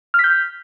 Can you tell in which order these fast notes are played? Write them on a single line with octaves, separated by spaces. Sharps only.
F6 B6 G6